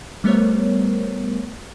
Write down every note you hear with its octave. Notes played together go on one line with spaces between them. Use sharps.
G3 A3 B3 A#4 C5 C#5